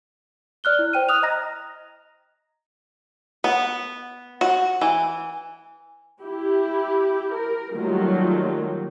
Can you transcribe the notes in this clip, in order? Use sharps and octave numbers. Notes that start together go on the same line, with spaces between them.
D5 F6 F#6 G7
E4
C5 G5 D#7
D#6 F6 F#6 F7
D#5 A#5 A#6
B3
F#4
E3
E4 G4
A#4
D#3 F#3 G3 A3 A#3 F4